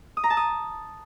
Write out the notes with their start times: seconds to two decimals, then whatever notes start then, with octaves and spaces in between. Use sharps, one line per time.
0.17 D#6
0.24 A#5
0.30 A5
0.37 D#6